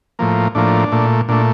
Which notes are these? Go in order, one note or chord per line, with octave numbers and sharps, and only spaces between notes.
A2 F3 A#3
A2 F3 A#3 D4
A#2 A3
A#2 A3 D4